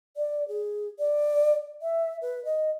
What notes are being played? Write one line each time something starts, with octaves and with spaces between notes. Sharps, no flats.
D5
G#4
D5
E5
B4
D#5